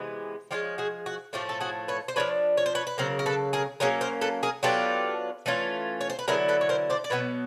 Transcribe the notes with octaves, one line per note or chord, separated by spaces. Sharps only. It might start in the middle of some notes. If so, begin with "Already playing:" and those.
Already playing: C3 E3 G#3 B3
F3 G#3 C#4 F4 G4
F#4 G#4
F#4
A2 F3 A3 F4 G4
A4
F#4 G#4
B4 C#5
C5
F3 A#3 D4 B4 C#5
C#5
C5
B4 C#5
B4
C#3 F#3 A#3 A#4 C5
A#4
A4 B4
G#4 A#4
F#3 A#3 C#4 G#4 A#4
A#4 C5
A4 B4
G#4 A#4
F#3 B3 D4 F4 G4 A4
E3 A3 C#4 F4
C#5
C5
B4
D3 F#3 B3 E4 G#4 A#4
A4 B4
C#5
A#4 C5
C5 D5
D5
B2 F#3 B3 B4 C#5